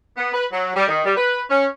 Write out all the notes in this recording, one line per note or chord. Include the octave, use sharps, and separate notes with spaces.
B3
B4
F#3
G3
D#3
G3
B4
C#4